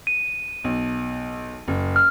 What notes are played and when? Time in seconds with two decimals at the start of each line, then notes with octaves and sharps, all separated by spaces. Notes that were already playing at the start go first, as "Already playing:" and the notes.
0.07 D#7
0.64 B1
1.68 F#1
1.96 F6